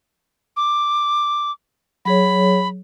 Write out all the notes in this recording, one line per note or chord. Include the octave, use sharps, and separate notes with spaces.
D6
F#3 G#4 C#5 B5